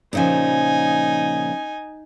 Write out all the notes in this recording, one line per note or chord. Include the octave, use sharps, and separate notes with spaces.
A#2 C#3 F3 D#4 G#5